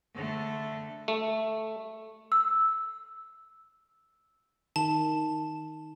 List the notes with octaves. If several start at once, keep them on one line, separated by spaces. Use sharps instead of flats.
D3 A3
A3
E6
D#3 A5